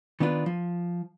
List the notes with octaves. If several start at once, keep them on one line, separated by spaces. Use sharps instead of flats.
D#3 B3 D4 F4 B4
F3